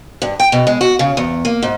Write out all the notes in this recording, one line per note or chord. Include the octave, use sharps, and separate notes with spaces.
G2
G5
B2
G#3
F#4
C#3
E2
A#3
G#2